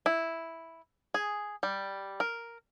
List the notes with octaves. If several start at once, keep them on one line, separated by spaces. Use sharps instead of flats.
E4
G#4
G3
A#4